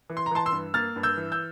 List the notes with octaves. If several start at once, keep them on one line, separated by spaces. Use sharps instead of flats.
E3
C6
A#5
E3 A5 C6
C6 E6
G2
A#3 F6 A6
G2
E6 G6
E3
E6 G6